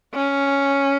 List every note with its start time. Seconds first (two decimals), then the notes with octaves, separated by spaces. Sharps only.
0.14 C#4